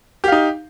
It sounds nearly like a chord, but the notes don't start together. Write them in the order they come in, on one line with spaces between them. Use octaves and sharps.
G4 F5 D#4